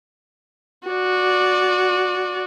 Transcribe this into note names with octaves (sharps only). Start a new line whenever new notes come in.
F#4 D5